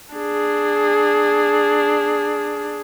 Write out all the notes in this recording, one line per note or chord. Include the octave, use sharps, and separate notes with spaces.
D4 G#4